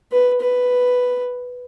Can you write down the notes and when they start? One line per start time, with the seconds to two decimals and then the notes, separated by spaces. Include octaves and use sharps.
0.12 B4
0.41 B4